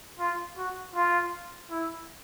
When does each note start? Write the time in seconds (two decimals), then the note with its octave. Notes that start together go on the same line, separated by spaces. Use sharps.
0.19 F4
0.57 F#4
0.96 F4
1.71 E4